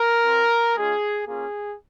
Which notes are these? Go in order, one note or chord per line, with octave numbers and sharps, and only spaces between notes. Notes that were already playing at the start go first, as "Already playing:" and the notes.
Already playing: A#4
C4 F4
G#3 C#4 F4 G#4
A#3 C#4 F4 G#4